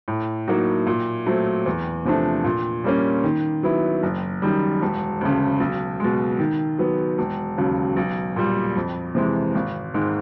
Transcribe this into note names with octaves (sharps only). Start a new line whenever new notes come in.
A2
F#3 A#3 D#4 F#4
A#2
F#3 A3 C4
E2
C3 F3 A3 D4
A#2
G3 A#3 C#4
D#3
F#3 B3 E4
F#1
F#2 D#3 G3
E1
D2 C#3
B1
B2 G#3
D#3
F#3 B3
E1
D#2 C#3 F#3
B1
A#2 G3
F2
C3 E3 G#3
G#1
G#2 D#3 G#3